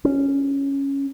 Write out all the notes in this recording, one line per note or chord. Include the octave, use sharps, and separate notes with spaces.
C#4